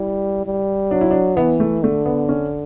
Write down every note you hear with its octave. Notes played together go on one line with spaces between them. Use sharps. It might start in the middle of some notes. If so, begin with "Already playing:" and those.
Already playing: G3 E4
G3
F#3 D4
E4
D4
E3 B3
A3
D3 A3
B3
C#4